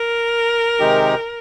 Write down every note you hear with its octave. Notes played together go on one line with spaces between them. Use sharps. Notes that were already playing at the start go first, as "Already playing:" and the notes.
Already playing: A#4
C3 D#3 G#3 D#4 G4